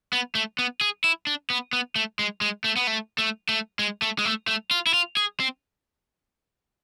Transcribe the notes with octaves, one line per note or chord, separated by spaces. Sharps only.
B3
A3
B3
G#4
E4
D4
B3
B3
A3
G#3
G#3
A3
B3
A3
A3
A3
G#3
A3
G#3
A3
A3
F4
E4
F4
G#4
C4